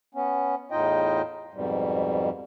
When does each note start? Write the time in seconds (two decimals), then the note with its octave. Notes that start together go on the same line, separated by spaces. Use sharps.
0.14 B3 C#4
0.71 E2 A2 D#4 F4 D#5 G5
1.54 F2 G#2 B2 G3